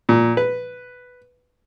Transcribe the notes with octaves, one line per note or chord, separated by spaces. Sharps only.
A#2
B4